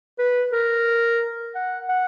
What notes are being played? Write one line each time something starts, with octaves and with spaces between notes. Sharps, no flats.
B4
A#4
F#5
F#5